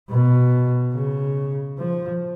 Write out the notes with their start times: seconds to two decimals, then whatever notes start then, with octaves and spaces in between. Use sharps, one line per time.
0.10 B2
0.94 C#3
1.79 F3